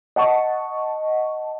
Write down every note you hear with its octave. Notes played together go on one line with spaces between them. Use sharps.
D#5 F#5 A5 C#6